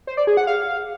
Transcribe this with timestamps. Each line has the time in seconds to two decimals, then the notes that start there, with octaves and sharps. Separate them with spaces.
0.07 C5
0.17 D5
0.27 G#4
0.37 F#5
0.47 F5